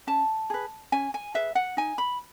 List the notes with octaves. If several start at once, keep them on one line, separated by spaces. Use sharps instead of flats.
C#4 A5
G#4 B4
C#4 G#5
G#5
G#4 B4 E5
F#5
D#4 G#5
B5